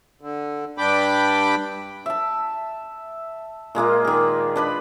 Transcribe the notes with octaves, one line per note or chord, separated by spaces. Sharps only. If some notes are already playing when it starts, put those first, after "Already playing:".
D3
G2 D4 G5 B5 D6
E5 A5
A#2 G#3 A#3 F4
D#3 G#4
D4 B4 B5